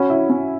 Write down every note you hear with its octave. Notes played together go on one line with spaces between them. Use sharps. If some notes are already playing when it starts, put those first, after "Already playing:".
Already playing: C#4 F#4 C#5 F#5 B5
E4
C#4